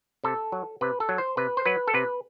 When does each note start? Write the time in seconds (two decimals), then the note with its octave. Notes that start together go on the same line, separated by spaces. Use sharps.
0.24 C3 A4
0.52 F#3
0.81 C3 B4
1.00 A4
1.09 F#3
1.18 C5
1.37 C3 B4
1.57 C5
1.66 F#3 B4
1.88 A4
1.94 C3 B4